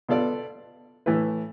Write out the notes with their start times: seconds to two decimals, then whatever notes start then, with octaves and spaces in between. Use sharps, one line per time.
0.09 B2 B3 F4 A4 D5
1.06 A2 E3 A3 E4 B4